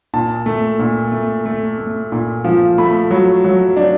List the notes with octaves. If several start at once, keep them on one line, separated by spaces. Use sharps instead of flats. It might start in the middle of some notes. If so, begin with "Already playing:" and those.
A#2 A5
A3
A#2
A3
A3
A3
A#2
F3
A3 B5
F#3
F#3
D4